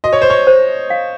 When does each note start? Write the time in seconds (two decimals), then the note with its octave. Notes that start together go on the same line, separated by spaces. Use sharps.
0.04 F#4 D#5
0.13 C#5
0.22 C5
0.30 C#5
0.47 C5
0.90 F5